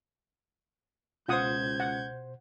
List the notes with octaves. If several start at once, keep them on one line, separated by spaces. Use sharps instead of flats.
C#2 B2 F4 C5 F#5 D#6 G6 G#6
F#5